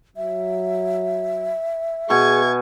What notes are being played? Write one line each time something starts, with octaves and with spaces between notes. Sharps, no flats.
F#3 E5
B2 G#4 G#5 C#6 G#6